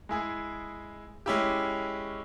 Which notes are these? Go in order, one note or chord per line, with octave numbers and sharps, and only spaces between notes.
G#3 E4 G#4
G#3 C#4 E4 G4